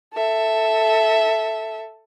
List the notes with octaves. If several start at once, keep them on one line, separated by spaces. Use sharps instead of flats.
A4 E5